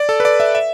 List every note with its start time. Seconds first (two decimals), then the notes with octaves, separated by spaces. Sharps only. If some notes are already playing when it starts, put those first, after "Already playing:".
Already playing: D5
0.09 A4
0.20 B4
0.25 D5
0.40 E5
0.55 E5